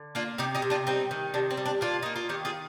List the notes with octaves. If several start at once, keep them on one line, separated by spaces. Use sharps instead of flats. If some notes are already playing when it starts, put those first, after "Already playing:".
Already playing: D3
A#3 D4 F4
C3 D#4 G4
D#4 G4
C3
D4 F4
G3 C4 D#4
D#3
C3 D4
C4
G3
D4
A#3 D4 F4
A#3 D#4
F4
D#3 D#4 G4
F4 G#4